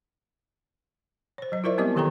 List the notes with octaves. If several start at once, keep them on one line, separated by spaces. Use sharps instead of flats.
C5 C#5
F#3 D#5
E4 F4 A#4 C5 D5 E5
G3 B3 C4 G4 D#5 D6
D#3 E3 G4 A4 G5 A#5